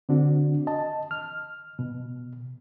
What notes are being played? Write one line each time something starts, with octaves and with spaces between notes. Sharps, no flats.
D3 C4 D4 F#4
D#5 A5
F6
B2